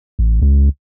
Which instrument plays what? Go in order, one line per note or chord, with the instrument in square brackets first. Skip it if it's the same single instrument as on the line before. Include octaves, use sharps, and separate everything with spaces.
[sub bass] A1
C#2